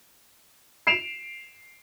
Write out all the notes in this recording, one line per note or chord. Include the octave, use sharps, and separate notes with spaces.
C7 D7 E7 F7